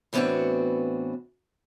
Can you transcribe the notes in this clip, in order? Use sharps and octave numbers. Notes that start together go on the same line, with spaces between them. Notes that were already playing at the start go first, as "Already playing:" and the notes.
A2 E3 B3 C4 D4 F#4